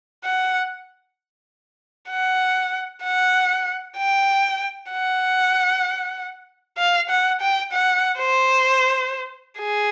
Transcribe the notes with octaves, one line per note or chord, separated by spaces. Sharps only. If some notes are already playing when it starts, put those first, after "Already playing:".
F#5
F#5
F#5
G5
F#5
F5
F#5
G5
F#5
C5
G#4